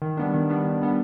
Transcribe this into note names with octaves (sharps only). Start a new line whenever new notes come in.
D#3
G3 B3 D4
D#3
G3 B3 D4
D#3
G3 B3 D4